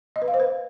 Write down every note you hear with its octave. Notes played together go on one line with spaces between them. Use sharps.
D#5
B4
F5
C5
B4